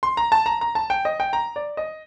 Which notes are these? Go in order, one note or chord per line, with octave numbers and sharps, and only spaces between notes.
C6
A#5
A5
A#5
A#5
A5
G5
D#5
G5
A#5
D5
D#5